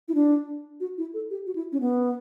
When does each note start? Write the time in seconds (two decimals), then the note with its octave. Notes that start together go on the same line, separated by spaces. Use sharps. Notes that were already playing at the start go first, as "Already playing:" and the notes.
0.08 E4
0.15 D4
0.80 F#4
0.98 E4
1.14 A4
1.30 G4
1.47 F#4
1.56 E4
1.72 C#4
1.81 B3